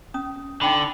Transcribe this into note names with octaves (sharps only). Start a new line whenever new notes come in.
C#4 D#6
D3 D#4 G5 B5